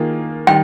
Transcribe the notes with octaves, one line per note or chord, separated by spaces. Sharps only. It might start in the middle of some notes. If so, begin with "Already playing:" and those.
Already playing: D#3 A#3 F4 G#4
D#3 G3 G5